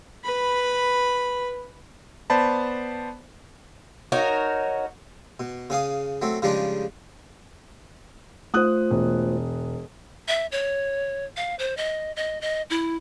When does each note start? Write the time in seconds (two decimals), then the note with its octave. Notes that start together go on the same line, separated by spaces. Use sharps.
0.24 B4 B5
2.30 B3 C5 D5 A5 B5
4.12 D#4 F#4 A#4 C#5
5.40 B2
5.70 C#3 G#4 F5 D#6
6.22 F#3 A3 C4
6.42 C#3 F3 G3 G#3 D4 D#4
8.54 A3 F4 C5 D#6 F#6
8.90 E1
10.28 E5
10.52 C#5
11.37 F5
11.59 C5
11.77 D#5
12.16 D#5
12.41 D#5
12.70 E4